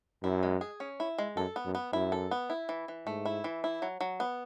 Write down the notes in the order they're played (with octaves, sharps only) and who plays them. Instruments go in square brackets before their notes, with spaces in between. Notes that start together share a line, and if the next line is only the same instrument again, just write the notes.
[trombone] F#2 [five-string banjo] E4
[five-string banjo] G#3
G#4
C#4
E4
G#3
[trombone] F#2 [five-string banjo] A4
[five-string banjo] B3
[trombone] F#2
[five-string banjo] B3
[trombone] F#2 [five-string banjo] E4
[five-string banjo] A4
B3
E4
E3
E3
[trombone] G#2 [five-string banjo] A3
[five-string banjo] E4
E3
E4
F#3
F#3
B3